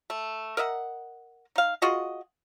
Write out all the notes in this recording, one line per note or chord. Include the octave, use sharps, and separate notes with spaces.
A3
A#4 D#5 E5 F#5
D#4 F5
F4 F#4 G#4 D#5